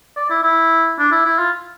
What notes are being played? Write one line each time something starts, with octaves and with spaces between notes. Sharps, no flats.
D5
E4
E4
D4
E4
E4
F4